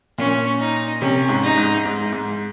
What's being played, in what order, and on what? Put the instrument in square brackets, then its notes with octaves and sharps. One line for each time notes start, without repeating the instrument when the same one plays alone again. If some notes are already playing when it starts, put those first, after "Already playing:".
[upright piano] A#2 [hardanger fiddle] C#4
[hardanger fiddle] D#4
[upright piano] C3 [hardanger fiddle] C#4
[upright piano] G#2
[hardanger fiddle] D#4
[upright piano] G#2
G#2
G#2